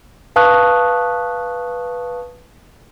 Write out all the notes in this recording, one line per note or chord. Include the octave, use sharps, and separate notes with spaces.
B4 F5 A5 C#6 D#6 F#6